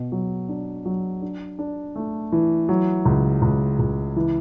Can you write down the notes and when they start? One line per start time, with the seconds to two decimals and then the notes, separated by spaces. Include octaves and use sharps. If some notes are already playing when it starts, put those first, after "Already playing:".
Already playing: B2
0.12 F#3
0.49 D4
0.85 F#3
1.22 D4
1.59 D4
1.96 A3
2.32 E3
2.69 F#3
3.06 C#2
3.42 C#2
3.79 C#2
4.16 E3